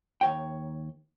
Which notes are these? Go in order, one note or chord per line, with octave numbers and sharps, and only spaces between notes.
D#2 C#5 G5